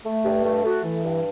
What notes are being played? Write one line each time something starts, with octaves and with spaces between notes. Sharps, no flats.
A3
G2
A3
A3 F#4
E3
G2